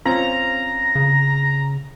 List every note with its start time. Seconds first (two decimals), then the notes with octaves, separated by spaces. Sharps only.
0.05 C4 C#4 F4 A#5
0.95 C#3